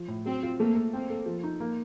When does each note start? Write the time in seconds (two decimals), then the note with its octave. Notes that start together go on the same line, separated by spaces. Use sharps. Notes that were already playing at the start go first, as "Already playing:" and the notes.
Already playing: F3
0.08 A2
0.26 F#3 C4
0.42 F4
0.59 A3 A#3
0.75 A4
0.93 A#3 C4
1.10 A4
1.26 F3
1.43 D#4
1.60 A#3